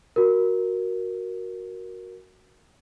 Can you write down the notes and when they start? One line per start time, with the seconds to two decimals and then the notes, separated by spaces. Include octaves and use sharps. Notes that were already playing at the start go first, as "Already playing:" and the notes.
0.16 F#4 A#4